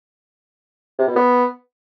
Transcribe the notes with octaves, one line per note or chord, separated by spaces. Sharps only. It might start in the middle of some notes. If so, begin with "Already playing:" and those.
C3
B2
B3